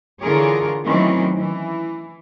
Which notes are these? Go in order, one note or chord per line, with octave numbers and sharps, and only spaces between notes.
D3 E3 F4 G#4 A#4 C#5
D#3 E3 F#3 A3 C4 C#4
E3